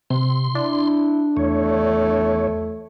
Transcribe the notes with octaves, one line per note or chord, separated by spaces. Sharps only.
C3 C6
D4 E4
E2 A3 C#5